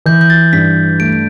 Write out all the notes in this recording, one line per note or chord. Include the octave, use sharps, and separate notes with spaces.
E3 G6
G6
A6
G2 B6
A3 D7